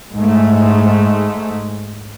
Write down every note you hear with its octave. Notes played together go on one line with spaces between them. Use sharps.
G#2 G#3 A3